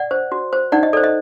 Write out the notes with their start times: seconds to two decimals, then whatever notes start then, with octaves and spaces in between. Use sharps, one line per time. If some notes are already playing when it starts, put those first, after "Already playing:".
Already playing: D5 F#5
0.11 C5
0.32 F#4
0.53 C5
0.72 D#4 D5 F#5
0.83 D#5
0.93 A4 C5 D5
1.04 D#5